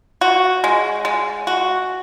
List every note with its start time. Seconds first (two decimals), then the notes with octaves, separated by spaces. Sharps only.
0.21 F#4
0.64 G#3
1.05 G#3
1.47 F#4